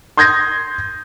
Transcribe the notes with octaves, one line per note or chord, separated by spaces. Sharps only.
C6 D#6 G6 G#6 A#6